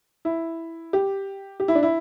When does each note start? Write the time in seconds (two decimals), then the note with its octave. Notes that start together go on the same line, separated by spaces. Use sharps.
0.25 E4
0.93 G4
1.60 G4
1.68 E4
1.75 D4
1.83 E4